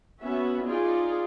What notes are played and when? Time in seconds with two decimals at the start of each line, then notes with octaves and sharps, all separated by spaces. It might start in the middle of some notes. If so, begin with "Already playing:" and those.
0.20 B3 C#4 F#4 E5
0.65 D#4 F4 G#4 D5